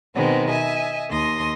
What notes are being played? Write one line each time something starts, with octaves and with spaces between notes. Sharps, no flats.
B2 D#3 G#3 B3 C4
D#5 E5 G#5
D#2 C6 D#6 A#6